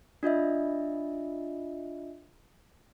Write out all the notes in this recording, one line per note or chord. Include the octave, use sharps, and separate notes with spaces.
D4 F4 D#5 E5